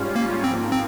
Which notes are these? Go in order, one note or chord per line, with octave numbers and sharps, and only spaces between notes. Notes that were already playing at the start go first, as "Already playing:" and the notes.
Already playing: G#2 G3 C#4 F4
A#3
G#2 F3 A#3 C4
C4